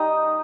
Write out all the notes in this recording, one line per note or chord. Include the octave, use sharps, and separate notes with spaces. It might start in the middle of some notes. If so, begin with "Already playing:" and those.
Already playing: G3 D#4 D#5